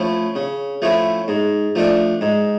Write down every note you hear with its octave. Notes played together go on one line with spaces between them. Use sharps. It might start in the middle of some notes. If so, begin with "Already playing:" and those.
Already playing: F3 A3 C#4 E4
C#3
F3 A3 C#4 E4
G#2
F3 A3 D4
G#2